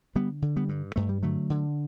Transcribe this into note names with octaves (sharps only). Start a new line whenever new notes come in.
D3 G3 B3
D3
G3 B3
G2
G2 A3
G3
D3 F#3 A3
D3